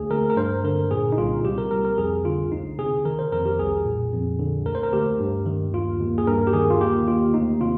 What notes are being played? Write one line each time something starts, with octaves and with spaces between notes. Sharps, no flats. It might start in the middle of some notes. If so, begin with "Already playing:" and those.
Already playing: D2 G#4
D2 A#4
A#4
G2 C5
D3 A#4
A#2 G#4
D#4
C2 F4
C2 G4
A#4
C2 A#4
A#4
F2 G#4
D3 F4
D2 D#4
C3 G#4
D#3 A#4
C5
F2 A#4
G4
C2 G#4
A#2
F2
D3
D2 A#4
C5
A#4
D2 G4
G2
D#3
D#2 F4
D#2
G#4
G2 A#4
G4
D#3 G#4
F4
D#2 G4
D#2 F4
D2 D#4
C3 F4